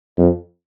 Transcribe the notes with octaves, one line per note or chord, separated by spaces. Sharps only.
F2